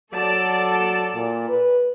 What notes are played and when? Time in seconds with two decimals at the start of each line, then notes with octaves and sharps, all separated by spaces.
0.13 F#3 A4 D5 A5
1.14 A#2
1.48 B4